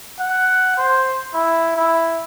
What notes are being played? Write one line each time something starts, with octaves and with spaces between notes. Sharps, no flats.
F#5
C5
E4
E4